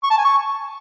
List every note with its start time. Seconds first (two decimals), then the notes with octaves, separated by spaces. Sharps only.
0.04 C#6
0.11 A5
0.17 G#5
0.24 C#6